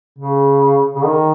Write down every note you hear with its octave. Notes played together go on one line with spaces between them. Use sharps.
C#3
C#3
D#3